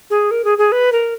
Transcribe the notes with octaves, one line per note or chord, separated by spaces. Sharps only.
G#4
A#4
G#4
G#4
B4
A#4